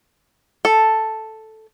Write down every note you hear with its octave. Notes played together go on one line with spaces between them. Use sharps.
A4